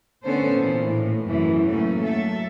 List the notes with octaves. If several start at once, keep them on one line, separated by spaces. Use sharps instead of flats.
D3 A3 B3 C#4 A4 C5
A#2 E3
A2
F#2 A2 C3 E3
F#3 A3 A#3 C#4
F#3 A4 E5